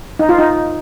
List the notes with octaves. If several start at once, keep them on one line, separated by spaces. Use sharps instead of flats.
D#4
F4
D#4